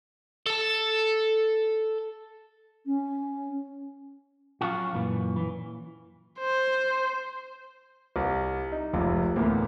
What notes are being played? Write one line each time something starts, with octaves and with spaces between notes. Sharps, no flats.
A4 A5
C#4
F#3 C#4 F4 F#4
F#2 A#2 E3
E3
C5
C2
D#4
F1 C#2
D2 A2 E3 A#3 B3